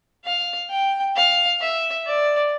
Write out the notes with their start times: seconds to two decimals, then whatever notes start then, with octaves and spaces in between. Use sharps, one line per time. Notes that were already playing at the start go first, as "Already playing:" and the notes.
0.25 F5
0.70 G5
1.16 F5
1.61 E5
2.06 D5